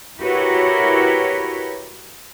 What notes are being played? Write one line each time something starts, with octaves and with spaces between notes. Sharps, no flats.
E4 F#4 G4 A#4 B4 C#5